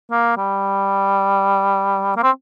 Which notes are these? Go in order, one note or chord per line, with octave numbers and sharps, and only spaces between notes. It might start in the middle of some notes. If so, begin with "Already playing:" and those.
A#3
G3
A#3
C4